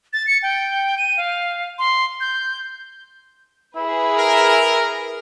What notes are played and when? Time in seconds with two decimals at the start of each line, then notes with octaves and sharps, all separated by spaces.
0.13 A6
0.27 C#7
0.43 G5
0.98 D#7
1.17 F5
1.78 C6
2.21 G6
3.76 E4 G#4 B4
4.17 A#4